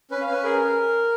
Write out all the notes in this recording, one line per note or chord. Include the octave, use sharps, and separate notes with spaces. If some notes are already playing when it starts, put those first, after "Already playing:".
C#4 B4
F5
C#4
B4
G#4 A#4